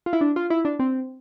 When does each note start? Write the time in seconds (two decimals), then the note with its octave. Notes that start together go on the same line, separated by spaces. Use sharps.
0.06 F4
0.13 E4
0.21 D4
0.36 F4
0.50 E4
0.65 D4
0.79 C4